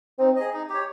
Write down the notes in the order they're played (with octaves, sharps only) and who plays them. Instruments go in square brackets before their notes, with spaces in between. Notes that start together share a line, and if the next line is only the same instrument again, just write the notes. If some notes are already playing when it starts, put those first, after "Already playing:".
[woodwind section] C4 [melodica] D#4
[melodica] G#4 D#5
D#4
G4 C#5